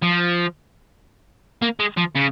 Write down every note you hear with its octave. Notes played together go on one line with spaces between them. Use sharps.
F3
A#3
G#3
F3
C#3